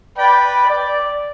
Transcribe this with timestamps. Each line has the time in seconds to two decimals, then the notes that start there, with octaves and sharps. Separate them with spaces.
0.18 B4 D5 G5 B5
0.69 D5